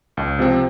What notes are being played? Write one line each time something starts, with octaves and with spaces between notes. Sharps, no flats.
C#2
C3 F3 C4